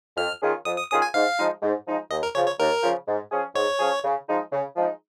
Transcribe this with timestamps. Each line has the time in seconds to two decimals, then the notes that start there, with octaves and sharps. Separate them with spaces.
0.17 F2 F6
0.42 D#3 C#4 F4 G#4
0.65 F2 D#6
0.78 D#6
0.90 D#3 C#4 F4 G#4 D#6
1.02 G#5
1.14 G#2 F5
1.38 F3 G#3 D#4
1.62 G#2
1.86 F3 G#3 D#4
2.11 D#2 D#5
2.23 A#4
2.35 C#3 F3 C#5
2.46 C#5
2.59 D#2 A#4
2.83 C#3 F3
3.08 G#2
3.31 F3 C#4 G#4
3.55 G#2 C#5
3.80 F3 C#4 G#4
4.04 C#3
4.28 F3 G#3 D#4
4.52 C#3
4.76 F3 G#3 D#4